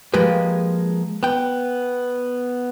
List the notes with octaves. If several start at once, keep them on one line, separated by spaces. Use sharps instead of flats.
F3 G#3 A#3 G4 B4
B3 G5